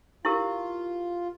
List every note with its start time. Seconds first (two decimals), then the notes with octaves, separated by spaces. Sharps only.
0.25 E4 F4 G4 A#4